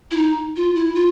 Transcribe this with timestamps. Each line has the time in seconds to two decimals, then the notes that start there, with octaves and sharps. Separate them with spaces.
0.11 E4
0.17 D#4
0.56 F4
0.75 E4
0.95 F4